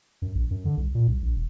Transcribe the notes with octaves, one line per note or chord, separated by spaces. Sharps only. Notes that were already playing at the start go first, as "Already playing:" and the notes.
F#2
A#1
F#2
D3
C2
A#2
C2
A#1
E1